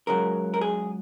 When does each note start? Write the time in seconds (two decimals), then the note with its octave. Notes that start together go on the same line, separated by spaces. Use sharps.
0.07 C#2 C#3 F#3 A#4
0.54 A#4
0.61 G#4